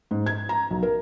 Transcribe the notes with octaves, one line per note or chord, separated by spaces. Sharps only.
G#2
G#6
A#5
B1
A#4